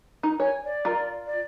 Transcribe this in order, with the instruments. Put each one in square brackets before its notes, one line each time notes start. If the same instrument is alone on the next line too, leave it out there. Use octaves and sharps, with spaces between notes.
[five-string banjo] D#4
[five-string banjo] C#5 [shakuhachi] G#5
[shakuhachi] D5
[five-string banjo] F4 A#4 A#5
[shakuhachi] D5